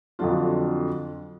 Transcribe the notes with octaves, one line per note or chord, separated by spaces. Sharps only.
F2 D3 F#3 D4 F4